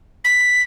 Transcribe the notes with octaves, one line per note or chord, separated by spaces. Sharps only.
B6